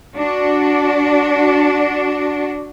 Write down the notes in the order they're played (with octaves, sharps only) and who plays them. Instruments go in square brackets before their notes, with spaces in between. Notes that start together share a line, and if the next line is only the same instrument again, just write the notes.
[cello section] D4 F#4